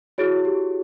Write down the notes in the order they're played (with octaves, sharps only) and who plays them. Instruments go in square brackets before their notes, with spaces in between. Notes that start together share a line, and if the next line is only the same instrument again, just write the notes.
[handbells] E4 G#4 C#5 [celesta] F#4
[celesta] G4